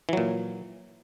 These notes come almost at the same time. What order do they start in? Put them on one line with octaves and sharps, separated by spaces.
E3 F#3 A#2